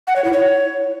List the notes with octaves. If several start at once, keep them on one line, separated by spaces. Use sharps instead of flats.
F#5
C#5
E4
C#5